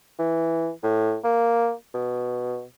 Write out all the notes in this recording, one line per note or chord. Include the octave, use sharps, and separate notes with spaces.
E3
A2
A#3
B2